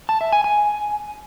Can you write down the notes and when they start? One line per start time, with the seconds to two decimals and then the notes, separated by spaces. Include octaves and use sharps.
0.09 A5
0.21 E5
0.32 G#5
0.44 G#5